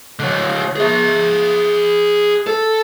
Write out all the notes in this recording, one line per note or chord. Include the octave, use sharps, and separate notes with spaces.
D3 F#3
G#4 E5
A4